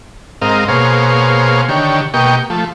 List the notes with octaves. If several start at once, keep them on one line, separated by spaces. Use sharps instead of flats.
G#2 C4 A#4 D#5 F5
B2 A#3 G#4 C5 C#5 F5
D3 D#3 G4 C#5
B2 A#3 G4 D#5 G5 C#6
F3 A3